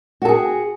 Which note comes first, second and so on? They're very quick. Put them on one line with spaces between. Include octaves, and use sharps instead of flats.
F#4 A4 G#4